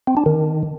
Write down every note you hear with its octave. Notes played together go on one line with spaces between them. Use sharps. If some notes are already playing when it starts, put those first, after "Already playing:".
C4
D4
D#3